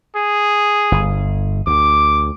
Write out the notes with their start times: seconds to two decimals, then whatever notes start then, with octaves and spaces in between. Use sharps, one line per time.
0.16 G#4
0.92 G1
1.67 D2 D6